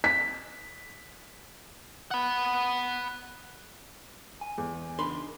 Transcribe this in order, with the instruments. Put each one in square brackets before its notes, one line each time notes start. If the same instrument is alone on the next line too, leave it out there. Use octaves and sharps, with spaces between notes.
[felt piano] B6
[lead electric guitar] F#5 B5
[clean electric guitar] G#5
[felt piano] E2
[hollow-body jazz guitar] C#2 B5 C6 [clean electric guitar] D4 D#4 A#4